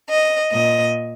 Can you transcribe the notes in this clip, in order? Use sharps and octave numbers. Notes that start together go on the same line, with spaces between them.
D#5
A#2 D#5